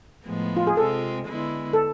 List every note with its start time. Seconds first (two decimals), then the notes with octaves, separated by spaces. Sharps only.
0.25 A2 F3 G#3 B3
0.57 F4
0.67 G#4
0.77 C3 G#3 C4 F4 A4
1.28 D3 G#3 B3 E4
1.73 A4